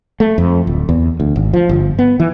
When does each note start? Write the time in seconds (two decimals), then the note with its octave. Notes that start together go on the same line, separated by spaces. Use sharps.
0.20 A3
0.38 F2
0.67 D1
0.89 E2
1.20 D2
1.36 G#1
1.54 F3
1.69 G1
1.99 B3
2.20 E3